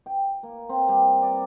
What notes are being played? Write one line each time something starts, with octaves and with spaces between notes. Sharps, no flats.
G5
A#3
C4
G3
D5